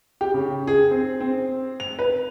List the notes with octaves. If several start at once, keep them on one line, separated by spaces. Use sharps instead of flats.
G4
C#3
G#4
C4
C4
F7
B4